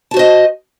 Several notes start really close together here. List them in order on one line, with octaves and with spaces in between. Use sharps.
A5 F#4 C5 D#5